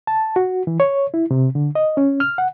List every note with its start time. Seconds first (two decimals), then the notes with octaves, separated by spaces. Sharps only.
0.07 A5
0.36 F#4
0.67 E3
0.80 C#5
1.14 E4
1.31 C3
1.55 D3
1.75 D#5
1.97 C#4
2.20 F6
2.38 F#5